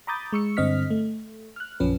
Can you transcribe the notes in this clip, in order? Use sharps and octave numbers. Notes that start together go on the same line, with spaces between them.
A#5 B5 D6 D#6 G6 A6
G#3 C#6 E6 C#7
G2 D3 C4 D#5 F6 B6
A3
F6 F#6
A#1 F#2 F3 C#4 B4